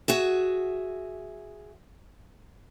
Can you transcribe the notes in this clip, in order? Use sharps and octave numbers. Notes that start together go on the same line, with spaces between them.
F#4 G#4 E5